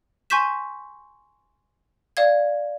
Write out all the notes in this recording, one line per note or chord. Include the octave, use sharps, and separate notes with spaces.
G#5 C6 C#6 G6 B6 E7
D5 F5 G#6